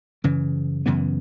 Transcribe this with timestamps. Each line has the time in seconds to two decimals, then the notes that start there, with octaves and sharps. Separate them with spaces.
0.24 F#2 C#3 E3
0.86 F#2 C#3 E3 B3